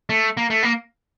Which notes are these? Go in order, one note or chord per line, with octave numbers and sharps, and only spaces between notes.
A3
A#3
A3
A#3